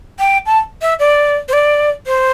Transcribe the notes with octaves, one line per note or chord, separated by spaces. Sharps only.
G5
A5
E5
D5
C5
D5
C5